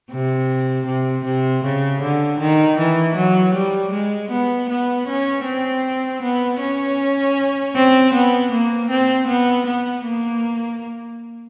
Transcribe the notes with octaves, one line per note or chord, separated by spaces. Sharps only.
C3
C3
C3
C#3
D3
D#3
E3
F#3
G3
G#3
B3
B3
C#4
C4
B3
C#4
C4
B3
A#3
C4
B3
B3
A#3